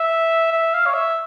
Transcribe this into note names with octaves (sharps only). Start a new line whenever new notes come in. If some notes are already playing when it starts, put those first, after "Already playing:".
Already playing: E5
E5
F5
C#5
E5